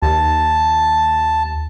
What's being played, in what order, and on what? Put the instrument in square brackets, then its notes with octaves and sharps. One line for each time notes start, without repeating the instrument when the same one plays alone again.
[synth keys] D#2 [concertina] A5